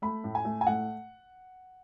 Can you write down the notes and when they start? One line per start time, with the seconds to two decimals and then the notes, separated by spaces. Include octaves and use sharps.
0.02 A3 B5
0.24 A2
0.35 G#5
0.45 A3
0.61 G#5
0.67 A2 F#5